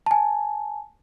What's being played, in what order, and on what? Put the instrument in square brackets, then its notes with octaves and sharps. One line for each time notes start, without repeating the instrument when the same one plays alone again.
[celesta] G#5 A5